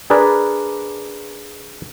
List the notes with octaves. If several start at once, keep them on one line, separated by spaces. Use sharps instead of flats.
D4 G#4 A#4 B4 D5